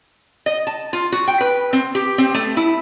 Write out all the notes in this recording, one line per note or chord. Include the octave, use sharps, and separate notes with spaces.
D#5
A5
F4
F#4
G5
B4
C4
G4
C4
A3
E4